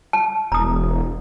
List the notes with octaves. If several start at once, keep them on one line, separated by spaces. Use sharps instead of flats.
A5
E1 A#5 D#6